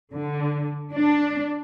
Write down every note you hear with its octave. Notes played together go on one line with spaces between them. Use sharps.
D3
D4